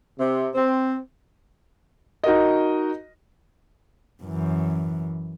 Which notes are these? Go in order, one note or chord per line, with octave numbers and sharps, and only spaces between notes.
C3
C4
D#4 F#4 A#4 D#5
F#2 E3